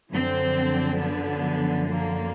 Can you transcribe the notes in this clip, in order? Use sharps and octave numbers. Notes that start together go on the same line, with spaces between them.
F#2 D3 F3 C4
B3
A#3